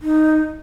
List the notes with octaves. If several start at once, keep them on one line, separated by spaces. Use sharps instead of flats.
D#4